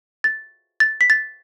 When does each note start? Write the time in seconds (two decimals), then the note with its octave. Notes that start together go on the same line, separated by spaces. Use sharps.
0.24 A6
0.80 A6
1.01 B6
1.10 A6